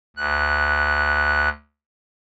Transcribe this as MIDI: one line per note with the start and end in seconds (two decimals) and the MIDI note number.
0.16 1.49 38
0.16 1.49 90